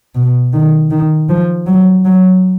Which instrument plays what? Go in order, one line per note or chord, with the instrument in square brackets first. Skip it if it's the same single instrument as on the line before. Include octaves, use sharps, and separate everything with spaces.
[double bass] B2
D#3
D#3
F3
F#3
F#3